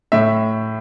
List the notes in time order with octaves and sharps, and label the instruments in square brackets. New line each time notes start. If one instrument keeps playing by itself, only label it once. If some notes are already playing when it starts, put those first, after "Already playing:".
[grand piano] A2 E5